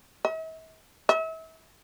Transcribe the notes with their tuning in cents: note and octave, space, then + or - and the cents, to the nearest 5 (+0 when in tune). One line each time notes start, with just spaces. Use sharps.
E5 -45
E5 -35